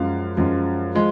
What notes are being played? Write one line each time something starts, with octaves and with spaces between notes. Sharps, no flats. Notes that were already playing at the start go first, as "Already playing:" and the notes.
Already playing: F#2 F3 G#3 F5
F#2 F3 G#3
F3 G#3